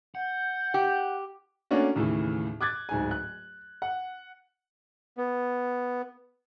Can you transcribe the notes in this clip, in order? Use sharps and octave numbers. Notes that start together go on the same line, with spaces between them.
F#5 G6
G4
A3 A#3 C#4 D4 F#4
D#2 A2 C#3 E3
D6 F#6 G#6 A6
D1 G#2 G#5
F#6
F#5
B3